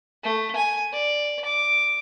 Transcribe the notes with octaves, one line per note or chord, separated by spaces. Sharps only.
A3
G#5
D5
D6